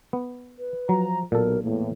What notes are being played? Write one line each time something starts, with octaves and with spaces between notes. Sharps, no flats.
B3
B4
F3 F#3 A#5
B1 A#2 A4 A#4
E2 A2 A#3